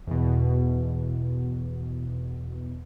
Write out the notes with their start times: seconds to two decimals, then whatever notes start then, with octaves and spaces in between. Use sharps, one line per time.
0.07 E2 B2